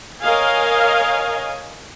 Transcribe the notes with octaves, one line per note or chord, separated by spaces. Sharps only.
A#4 C#5 D#5 F5 G#5